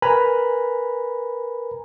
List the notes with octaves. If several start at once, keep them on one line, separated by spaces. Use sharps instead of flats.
A#4 B4 G#5 A#5 B5